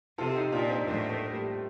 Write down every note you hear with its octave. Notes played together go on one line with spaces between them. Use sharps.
C3 F4 A4
D#4 G4
A#2 D4 F4
C4 D#4
A2 A#3 D4
A3 C4
G3 A#3